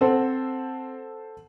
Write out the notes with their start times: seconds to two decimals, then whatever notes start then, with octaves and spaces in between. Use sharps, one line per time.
0.01 C4 A4 C5 F#5